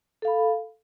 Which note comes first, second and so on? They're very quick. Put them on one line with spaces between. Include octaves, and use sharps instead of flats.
A4 F5 B5